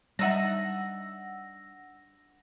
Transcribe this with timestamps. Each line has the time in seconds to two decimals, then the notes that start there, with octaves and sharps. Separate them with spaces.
0.19 G3 D4 D#4 E5 F#5 E6 A#6